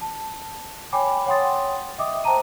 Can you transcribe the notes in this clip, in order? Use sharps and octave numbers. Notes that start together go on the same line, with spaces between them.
A5
C#5 G5 G#5 B5 D6
C#5 F#5 G5 C6 D#6 A6
D#5 E5 G5 D6 D#6
C5 G5 A5 A#5 D#7